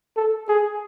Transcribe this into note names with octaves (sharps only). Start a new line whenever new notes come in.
A4
G#4